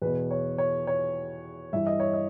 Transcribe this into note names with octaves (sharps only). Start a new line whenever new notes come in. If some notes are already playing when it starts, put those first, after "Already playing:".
E2 B2 B4
C#5
C#5
C#5
G2 E3 E5
D#5
C#5
D#5